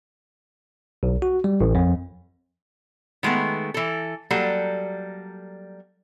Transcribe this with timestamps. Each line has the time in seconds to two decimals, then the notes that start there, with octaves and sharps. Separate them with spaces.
1.03 B1
1.22 F#4
1.44 G3
1.61 A1
1.75 F2
3.23 D#3 G#3 A3 B3
3.74 E3 A4
4.30 F#3 G3 A#3 A4